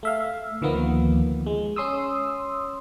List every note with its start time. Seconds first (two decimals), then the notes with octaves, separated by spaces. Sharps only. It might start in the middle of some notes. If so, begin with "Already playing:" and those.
0.03 A3 E5 F5
0.62 D2 D#3 F3 A#3 B3
1.46 G#3
1.76 C#4 C6 D#6 E6